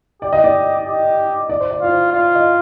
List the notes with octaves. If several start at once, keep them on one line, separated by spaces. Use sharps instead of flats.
G4 D5
D#5
D5
G4
D5
C5
D5
F4 D5
C5
F4 D5
D#5